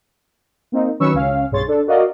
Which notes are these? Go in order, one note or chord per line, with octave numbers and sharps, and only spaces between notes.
A#3 C4 D#4
D#3 F#3 C#4 B4 C#6 E6
C#2 C#4 F5
B1 G2 G#4 C#5 C6 A6
D4 A4
F#4 A#4 D5 D#5 F5